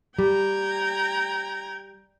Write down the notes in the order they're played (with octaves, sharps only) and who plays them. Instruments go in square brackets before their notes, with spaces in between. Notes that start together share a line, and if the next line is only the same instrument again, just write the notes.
[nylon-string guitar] G3 [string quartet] G5 A#5 G#6